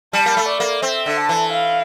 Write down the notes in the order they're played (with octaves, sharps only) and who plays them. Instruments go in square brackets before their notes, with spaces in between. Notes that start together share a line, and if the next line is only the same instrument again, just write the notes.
[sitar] G3 [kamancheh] A5
[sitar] A#3
A3
[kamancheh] D5
[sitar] A#3
[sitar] C4 [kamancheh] E5
[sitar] D3
[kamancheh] A5
[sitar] E3
[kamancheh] F5